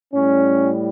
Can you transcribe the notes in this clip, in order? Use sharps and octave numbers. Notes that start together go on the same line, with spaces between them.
A2 G3 C#4